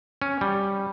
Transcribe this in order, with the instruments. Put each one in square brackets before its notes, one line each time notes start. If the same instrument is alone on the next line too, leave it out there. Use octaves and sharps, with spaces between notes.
[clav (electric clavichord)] C#4
G3